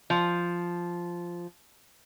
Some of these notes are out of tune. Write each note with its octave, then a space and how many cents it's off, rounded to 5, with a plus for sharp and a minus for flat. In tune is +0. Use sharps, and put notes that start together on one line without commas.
F3 -5